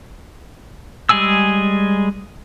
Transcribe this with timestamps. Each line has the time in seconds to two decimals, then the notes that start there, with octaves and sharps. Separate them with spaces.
1.09 G3 G#3 G#4 G#5 E6